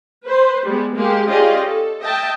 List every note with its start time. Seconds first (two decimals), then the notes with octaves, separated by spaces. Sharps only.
0.24 B4 C5
0.66 G3 G#3 B3
0.95 G#3 A#3 G4
1.28 C#4 F4 G4 G#4 D5 D#5
1.65 A4
2.01 D#5 E5 G5 A5